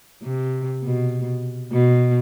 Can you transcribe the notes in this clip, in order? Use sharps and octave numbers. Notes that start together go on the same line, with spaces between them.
C3
B2
B2